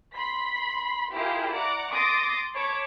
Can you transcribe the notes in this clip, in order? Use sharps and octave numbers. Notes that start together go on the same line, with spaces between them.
B5 C6 B6
E4 F4 G4 G#4 A#4
D5 F#5 A#5 D6
C6 D6 D#6 A6 A#6
C#5 A5 B5 D6